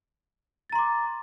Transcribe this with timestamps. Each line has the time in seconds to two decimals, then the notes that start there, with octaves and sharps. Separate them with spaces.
0.70 A6
0.73 A#5
0.75 C6
0.78 D6